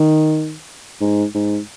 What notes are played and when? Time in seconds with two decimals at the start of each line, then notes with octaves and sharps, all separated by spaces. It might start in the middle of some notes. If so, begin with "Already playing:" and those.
Already playing: D#3
1.00 G#2
1.35 G#2